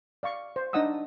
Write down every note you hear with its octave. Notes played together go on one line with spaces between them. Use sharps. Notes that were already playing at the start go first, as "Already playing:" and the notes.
D5 F5 C#6
C5
D4 D#4 D#5 F#5 D#6 E6